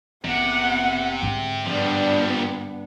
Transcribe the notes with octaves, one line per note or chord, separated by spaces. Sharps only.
F#1 C3 B3 F#5
G#2 D3
G2 F3 G3 B3 D4